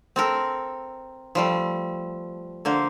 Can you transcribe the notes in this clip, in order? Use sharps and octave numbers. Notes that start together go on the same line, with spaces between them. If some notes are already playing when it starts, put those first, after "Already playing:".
C4 A4 A#4
F3 G3 A3
D3 A#3 C5